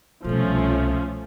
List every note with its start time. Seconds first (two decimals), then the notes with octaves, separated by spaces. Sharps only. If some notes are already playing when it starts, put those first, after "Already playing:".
0.24 C2 B2 F3 A3 C#4